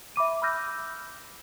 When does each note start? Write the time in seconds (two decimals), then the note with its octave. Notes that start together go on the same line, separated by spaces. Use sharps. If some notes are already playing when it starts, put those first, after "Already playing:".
0.16 E5 B5 D6 D#7
0.42 B5 D6 E6 F6 G6 A#6